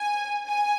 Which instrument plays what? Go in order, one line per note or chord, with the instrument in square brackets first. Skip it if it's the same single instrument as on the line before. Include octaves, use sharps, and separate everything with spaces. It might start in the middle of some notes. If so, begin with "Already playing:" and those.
Already playing: [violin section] G#5
G#5